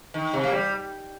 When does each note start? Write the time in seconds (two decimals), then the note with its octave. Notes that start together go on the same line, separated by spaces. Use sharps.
0.14 D#3
0.34 C3
0.44 A#3
0.52 G3